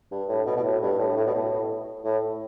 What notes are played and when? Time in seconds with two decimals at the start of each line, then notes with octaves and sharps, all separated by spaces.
0.11 G2
0.28 A2
0.46 B2
0.57 B2
0.64 A2
0.82 G2
0.99 A2
1.16 A2
1.26 B2
1.34 A2
2.04 A2